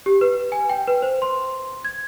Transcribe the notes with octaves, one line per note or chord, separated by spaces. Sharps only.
G4
B4
G#5
G5
B4
C5
C6
G#6